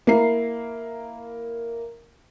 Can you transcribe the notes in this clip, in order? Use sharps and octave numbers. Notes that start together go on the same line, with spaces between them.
A#3 E4 A#5 C7